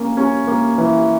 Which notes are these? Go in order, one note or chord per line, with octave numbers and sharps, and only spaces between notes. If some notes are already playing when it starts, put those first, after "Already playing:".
Already playing: A#3 C#4
C#4
A#3
E3